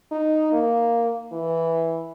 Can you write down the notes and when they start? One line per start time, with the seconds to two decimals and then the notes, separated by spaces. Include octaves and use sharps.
0.12 D#4
0.53 A#3
1.32 E3